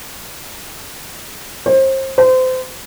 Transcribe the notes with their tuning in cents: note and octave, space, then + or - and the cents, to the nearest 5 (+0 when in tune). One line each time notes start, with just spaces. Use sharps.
C5 +30
C5 -30